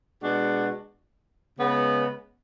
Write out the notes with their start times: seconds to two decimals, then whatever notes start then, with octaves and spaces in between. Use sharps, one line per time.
0.20 B2 G#3 D4 F#4
1.59 C#3 G#3 B3